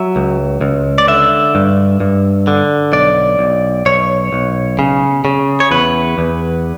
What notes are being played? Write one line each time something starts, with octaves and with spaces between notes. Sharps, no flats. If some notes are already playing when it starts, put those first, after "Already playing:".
Already playing: F#3 E5
C#2
C#2
D5
D3 E5
G2
G2
D3
B1 D5
B1
B1 C#5
B1
C#3
C#3
C#5
E2 B4
E2